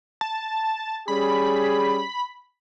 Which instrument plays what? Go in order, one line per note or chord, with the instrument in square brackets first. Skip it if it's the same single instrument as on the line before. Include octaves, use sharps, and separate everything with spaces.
[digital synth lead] A5
[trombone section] G3 C#4 G#4 [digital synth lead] B5